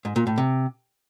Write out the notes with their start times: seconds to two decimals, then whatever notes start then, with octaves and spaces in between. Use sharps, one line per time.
0.05 G#2
0.16 A#2
0.27 A2
0.38 C3